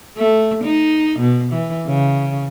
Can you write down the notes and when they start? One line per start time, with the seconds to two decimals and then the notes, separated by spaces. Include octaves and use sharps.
0.17 A3
0.64 D#4
1.19 B2
1.53 E3
1.87 C#3